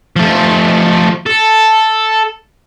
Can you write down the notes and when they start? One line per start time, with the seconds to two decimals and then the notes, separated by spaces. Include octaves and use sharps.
0.16 F3 A3
1.26 A4